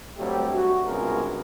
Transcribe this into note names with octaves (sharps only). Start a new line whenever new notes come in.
G2 F#3 G3 A3 C4 G4
F#4
C#2 G2 C3 B3 G#4 A#4